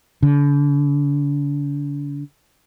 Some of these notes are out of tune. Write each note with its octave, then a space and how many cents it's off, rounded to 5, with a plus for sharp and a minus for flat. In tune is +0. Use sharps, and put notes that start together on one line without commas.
D3 -40